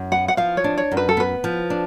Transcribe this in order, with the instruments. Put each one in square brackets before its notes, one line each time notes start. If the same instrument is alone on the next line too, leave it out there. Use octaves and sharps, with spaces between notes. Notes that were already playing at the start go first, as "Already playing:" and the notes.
Already playing: [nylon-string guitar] F#2
[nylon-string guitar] B3 [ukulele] F#5
[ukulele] F#5
[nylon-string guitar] F3 [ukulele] F5
[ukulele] C#5
[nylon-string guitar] D4
[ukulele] C#5
[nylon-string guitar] F#2
[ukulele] B4
A4
[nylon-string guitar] B3 [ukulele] B4
[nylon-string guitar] F3
D4